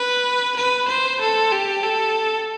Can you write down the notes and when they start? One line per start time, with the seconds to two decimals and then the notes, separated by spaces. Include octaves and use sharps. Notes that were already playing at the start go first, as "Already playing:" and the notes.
Already playing: B4
0.56 B4
0.88 C5
1.20 A4
1.52 G4
1.83 A4